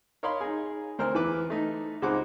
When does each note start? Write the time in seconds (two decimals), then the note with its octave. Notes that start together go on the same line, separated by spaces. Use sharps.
0.23 A#4 C#5 D#5 F5 B5 C6
0.41 D#4 G#4
0.99 D2 C4 A#4 C5 F6
1.14 E2 E3 B4 D6
1.50 A3 D#4
2.02 C#2 G#3 C4 D#4 F#5 D6